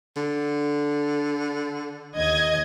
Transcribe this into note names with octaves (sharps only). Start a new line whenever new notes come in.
D3
D#2 D#5 G#6